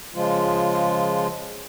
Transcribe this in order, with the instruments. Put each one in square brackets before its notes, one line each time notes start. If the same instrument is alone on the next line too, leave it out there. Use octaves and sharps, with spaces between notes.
[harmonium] C#3 F3 G#3 F4